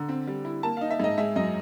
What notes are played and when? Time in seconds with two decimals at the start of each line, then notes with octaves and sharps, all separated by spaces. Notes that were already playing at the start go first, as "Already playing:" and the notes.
Already playing: D3 A#5
0.09 C4
0.27 G3
0.45 E4
0.63 A#3 A5
0.77 D#4 F5
0.91 E5
1.00 G#2 D#5
1.18 G#3 E5
1.36 F#2 D#5